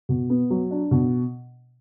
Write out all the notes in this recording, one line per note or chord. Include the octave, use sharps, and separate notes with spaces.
B2
B3
F#3
D4
B2